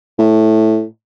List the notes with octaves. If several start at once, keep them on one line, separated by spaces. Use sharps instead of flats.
A2